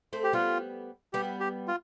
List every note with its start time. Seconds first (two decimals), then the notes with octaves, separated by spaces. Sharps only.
0.13 A3 C4
0.24 G4
0.33 G3 B3 F4
1.13 G3 B3 G4
1.40 G4
1.68 F4